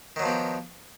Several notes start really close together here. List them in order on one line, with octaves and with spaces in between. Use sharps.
D#3 F#3 F3 B3 G4